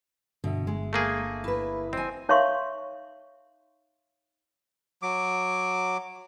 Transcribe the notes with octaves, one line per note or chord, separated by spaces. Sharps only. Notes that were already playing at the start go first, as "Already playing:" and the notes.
G1 B2 D3 E5
G#3
A3 A#3 G#4
E4 B4
C4 D#5 G#5
D#4 C#5 E5 F5 C6 C#6
F#3 D6